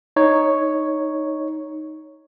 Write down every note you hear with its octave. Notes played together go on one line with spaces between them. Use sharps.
D#4 C#5